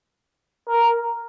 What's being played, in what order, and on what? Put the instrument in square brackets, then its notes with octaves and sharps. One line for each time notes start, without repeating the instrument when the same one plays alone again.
[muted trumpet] A#4